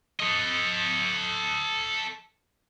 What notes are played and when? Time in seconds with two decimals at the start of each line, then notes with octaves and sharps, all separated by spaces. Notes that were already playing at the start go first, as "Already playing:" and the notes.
0.20 A4 D#5